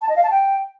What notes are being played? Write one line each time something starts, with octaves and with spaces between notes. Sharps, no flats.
A5
D#5
F5
A5
G5